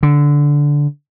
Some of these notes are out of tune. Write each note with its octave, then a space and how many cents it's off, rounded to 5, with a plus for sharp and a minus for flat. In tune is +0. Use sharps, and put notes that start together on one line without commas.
D3 -10